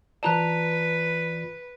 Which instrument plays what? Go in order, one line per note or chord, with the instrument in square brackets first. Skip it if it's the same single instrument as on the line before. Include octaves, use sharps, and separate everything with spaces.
[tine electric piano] E3 F4 D5 [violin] B4 [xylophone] A5 A#5 F#6